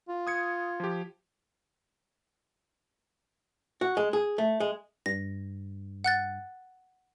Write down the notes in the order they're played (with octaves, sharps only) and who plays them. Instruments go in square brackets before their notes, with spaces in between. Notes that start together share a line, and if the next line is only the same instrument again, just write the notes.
[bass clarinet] F4
[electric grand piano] D#6 G#6 C#7
F3 G4
[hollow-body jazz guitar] F#4
G#3
G#4
A3
G#3
[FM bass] G2 [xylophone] A#6
[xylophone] F#5 F#6 A6